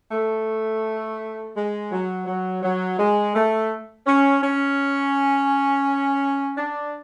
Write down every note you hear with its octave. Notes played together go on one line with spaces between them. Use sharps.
A3
G#3
F#3
F#3
F#3
G#3
A3
C#4
C#4
D4